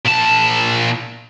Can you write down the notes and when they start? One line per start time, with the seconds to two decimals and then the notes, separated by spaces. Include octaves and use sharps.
0.05 A#2 A5